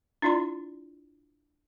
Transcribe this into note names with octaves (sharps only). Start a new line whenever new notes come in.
D4 E4 F4 D5 C6